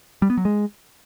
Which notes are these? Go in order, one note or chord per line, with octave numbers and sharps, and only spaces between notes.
G3
B3
F#3
G#3